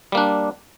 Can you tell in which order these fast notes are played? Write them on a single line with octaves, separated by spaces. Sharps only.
G3 A#3 D4